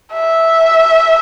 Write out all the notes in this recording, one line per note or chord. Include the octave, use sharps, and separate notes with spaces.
E5